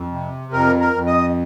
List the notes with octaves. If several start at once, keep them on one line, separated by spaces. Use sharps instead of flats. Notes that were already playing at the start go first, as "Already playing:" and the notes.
Already playing: F2
C3
F2 A#4
A#4
F2
D#5